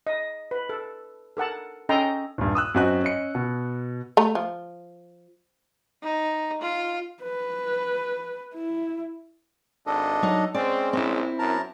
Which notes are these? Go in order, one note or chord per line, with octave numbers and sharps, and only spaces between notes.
D#5
B4
A4
A4 A#4 F#5 A5
C#4 A4 D#5 G5 A#5 C6
D#1 G2
D#6 E6 F#6
F#2 C4 F#4 D#5 F#6
C#4 D#5 C#7
B2
A3 A#5
F3
D#4
F4
B4
E4
G#1 D4 A4 D#5
F#3 D#4
G#3 C4 C#4 D5
A#1 C4 E4
F#2 A#4 A5 A#5